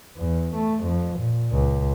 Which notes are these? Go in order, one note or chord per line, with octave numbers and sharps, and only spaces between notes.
E2
A3
F2
A#2
C#2